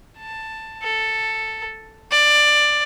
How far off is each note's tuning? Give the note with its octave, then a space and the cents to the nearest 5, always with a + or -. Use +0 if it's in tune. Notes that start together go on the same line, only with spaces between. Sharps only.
A5 +10
A4 +5
D5 +15